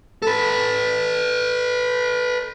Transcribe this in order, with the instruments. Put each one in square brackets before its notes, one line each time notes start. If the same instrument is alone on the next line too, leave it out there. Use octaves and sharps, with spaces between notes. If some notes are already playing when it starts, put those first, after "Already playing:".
[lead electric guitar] A4 B4